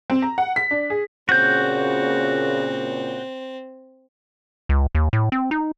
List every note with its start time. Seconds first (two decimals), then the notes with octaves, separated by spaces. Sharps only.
0.10 C4
0.22 A#5
0.38 F#5
0.56 B6
0.71 D4
0.90 G#4
1.29 A#2 C#3 C4 F#4 G6
4.69 C#2
4.95 D#2
5.13 A2
5.32 C4
5.51 D#4